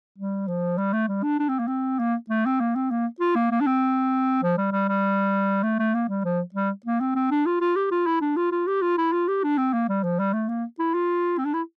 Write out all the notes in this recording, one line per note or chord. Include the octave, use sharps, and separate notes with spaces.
G3
F3
G3
A3
G3
D4
D4
C4
A#3
C4
A#3
A3
C4
A#3
C4
A#3
F4
A#3
A#3
D4
C4
F3
G3
G3
G3
A3
A3
A#3
G3
F3
G3
A#3
C4
C4
D4
F4
F4
G4
F4
E4
D4
F4
F4
G4
F4
E4
F4
G4
D4
C4
A#3
G3
F3
G3
A3
A#3
E4
F4
C4
D4
E4